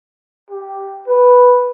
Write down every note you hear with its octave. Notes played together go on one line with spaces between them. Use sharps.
G4
B4